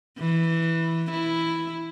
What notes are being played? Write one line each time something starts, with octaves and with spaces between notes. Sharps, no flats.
E3
E4